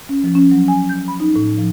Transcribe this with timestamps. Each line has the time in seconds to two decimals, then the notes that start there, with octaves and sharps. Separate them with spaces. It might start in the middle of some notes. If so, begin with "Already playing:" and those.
0.09 C#4
0.23 F3
0.35 C#4
0.51 F#3
0.68 G#5
0.89 G6
1.08 B5
1.20 D#4
1.36 A2
1.58 F3